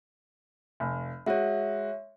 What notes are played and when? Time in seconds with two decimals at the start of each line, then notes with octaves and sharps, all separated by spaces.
0.80 F1
1.26 G#3 F#4 C#5 E5